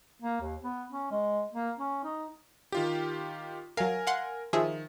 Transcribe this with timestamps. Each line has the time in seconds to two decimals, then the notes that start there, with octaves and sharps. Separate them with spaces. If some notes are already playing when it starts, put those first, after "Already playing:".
0.22 A#3
0.41 D#2
0.64 B3
0.92 C#4
1.11 G#3
1.53 A#3
1.79 C#4
2.04 D#4
2.72 D#3 F4 G4
3.77 F#3 A#4 F5 G#5
4.07 F5 F#5 C6
4.53 D#3 F3 G#4 E5